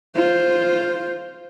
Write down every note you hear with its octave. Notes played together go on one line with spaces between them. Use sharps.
F4 C5